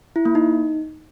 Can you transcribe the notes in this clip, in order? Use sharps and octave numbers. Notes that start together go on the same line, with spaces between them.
E4
A#3
D#4